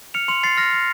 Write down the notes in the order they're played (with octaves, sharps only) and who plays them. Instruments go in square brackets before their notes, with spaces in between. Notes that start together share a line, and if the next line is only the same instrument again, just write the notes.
[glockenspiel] F6 C#7 F7
C6 C#7 F7
C6 A6 C7
F6 A#6
F6